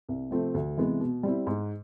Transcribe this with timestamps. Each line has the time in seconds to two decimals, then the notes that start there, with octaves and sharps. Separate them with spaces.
0.09 C2
0.31 C3 F3 A3 C4
0.54 D2
0.77 C3 E3 G#3 B3
1.00 B2
1.23 G3 C4 E4
1.47 G#2